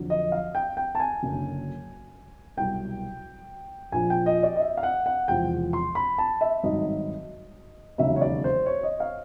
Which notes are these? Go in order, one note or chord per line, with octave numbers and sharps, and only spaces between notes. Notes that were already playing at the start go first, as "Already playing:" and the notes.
Already playing: F2 D3 F#3
D#5
F5
G5
G5
A5
G#5
F#1 F#2 D3
C2 B2 F#3 G5
A#1 A#2 F3 G#5
G5
D#5
D5
D#5
E5
F5
F#5
F#5
E1 E2 C3 F3 G5
C6
B5
A5
E5
G#1 G2 D#3 F#3 D#5
E1 D#2 C#3 F#3 E5
C#5
D5
C5
C#5
D#5
F5